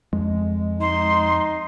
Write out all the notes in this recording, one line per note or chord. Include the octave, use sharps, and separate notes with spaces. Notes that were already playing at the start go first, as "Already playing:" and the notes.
F2 G#3
D#4 C6